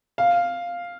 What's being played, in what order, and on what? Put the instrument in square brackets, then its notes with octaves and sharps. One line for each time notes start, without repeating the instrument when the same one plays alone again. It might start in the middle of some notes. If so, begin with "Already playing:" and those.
[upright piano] F5